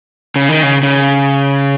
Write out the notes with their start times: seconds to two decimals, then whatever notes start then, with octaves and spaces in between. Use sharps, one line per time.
0.36 C#3
0.49 D#3
0.63 C#3
0.83 C#3